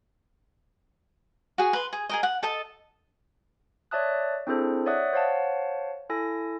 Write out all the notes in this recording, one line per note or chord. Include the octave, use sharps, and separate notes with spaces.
F#4 G#4
B4 C6
G#4
G#4 A#4 D#5
F#5
A4 D#5 A5
C#5 D5 E5 A5 D#6 F#6
C4 D4 E4 G#4 A4 C5
C#5 D5 E5 F#5 D#6 F#6
C5 C#5 F5 F#5 A5
E4 A4 G#5 A#6